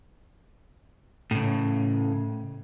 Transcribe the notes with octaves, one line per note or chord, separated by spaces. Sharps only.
A2 C#3